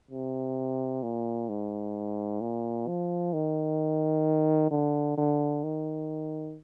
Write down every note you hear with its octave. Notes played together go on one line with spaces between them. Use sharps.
C3
A#2
G#2
A#2
F3
D#3
D3
D3
D#3